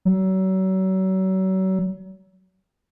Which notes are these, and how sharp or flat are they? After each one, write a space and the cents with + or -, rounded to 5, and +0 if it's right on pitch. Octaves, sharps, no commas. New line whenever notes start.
F#3 +35